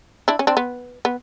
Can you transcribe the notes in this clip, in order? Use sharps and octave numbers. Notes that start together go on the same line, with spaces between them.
D4 E4
C#4
C4 D4
B3
B3